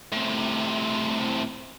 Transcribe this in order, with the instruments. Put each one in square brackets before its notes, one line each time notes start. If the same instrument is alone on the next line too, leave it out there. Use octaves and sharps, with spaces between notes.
[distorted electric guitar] A2 C3